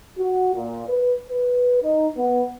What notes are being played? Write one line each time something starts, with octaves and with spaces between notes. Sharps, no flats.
F#4
A#2
B4
B4
D#4
B3